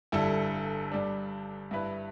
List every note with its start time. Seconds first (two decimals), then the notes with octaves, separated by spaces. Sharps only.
0.12 G1 G2 G3 E4 A4
0.92 G2 G3 D4
1.71 G2 G3 E4 B4